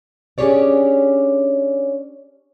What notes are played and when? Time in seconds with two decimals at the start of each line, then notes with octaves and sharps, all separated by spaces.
0.38 C#4 D4 G4 G#4 C#5 D5